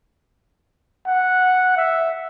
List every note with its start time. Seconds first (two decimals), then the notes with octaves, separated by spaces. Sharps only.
1.06 F#5
1.77 E5